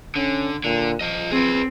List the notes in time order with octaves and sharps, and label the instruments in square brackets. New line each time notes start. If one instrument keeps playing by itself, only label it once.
[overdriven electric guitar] D3 [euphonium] C#4
[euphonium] A#2 [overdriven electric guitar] D3
[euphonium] F3 [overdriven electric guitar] F4 D#5
[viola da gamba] C4 [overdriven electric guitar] G#4 B4